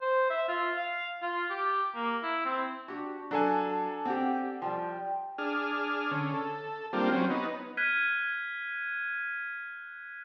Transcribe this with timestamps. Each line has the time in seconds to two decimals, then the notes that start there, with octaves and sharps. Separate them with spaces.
0.01 C5
0.30 E5
0.48 F4
0.77 F5
1.22 F4
1.50 G4
1.95 A#3
2.23 E4
2.45 C4
2.88 D4 F#4 G4
3.31 F#3 D4 A4 G#5 A5
3.70 A5
4.05 C4 G4 F#5
4.62 F3 G3 G5
5.38 D4 G#4 F6
6.11 D3 C#4
6.34 A4
6.93 G3 A#3 C4 D4 F4 G4
7.12 F#3 C4 C#4
7.30 B3 D#4
7.77 F6 F#6 G#6 B6 D#7